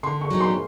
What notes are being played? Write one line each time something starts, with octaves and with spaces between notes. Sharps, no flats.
D3 C6
C#6
F#3 B3 D#4 G4
C6